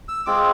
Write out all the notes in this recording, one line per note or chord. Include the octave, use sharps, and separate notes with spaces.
E6
G#3 C4 F4 D6